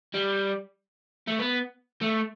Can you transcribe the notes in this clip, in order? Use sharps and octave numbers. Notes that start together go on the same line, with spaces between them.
G3
A3
B3
A3